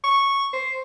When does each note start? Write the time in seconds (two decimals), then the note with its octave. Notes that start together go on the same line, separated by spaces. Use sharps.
0.04 C#6
0.53 C5